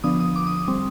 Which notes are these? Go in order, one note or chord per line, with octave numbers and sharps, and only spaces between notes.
D3 F3 B3 D4 D#6
D#6
D6
D#6
D#6
G3 C4